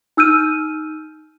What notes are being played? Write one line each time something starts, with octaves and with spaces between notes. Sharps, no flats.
D#4 E6 F6 G6 D#7